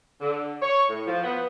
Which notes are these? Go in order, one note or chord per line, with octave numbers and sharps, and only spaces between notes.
D3
C#5
A2
F3
B3